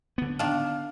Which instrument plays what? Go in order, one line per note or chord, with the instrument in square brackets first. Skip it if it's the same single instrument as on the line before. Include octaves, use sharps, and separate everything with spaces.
[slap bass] D3 B3
[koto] D#3 D4 [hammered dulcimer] F5